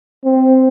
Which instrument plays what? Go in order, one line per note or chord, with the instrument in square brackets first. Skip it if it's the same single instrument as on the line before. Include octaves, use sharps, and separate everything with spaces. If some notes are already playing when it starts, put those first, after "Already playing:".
[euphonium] C4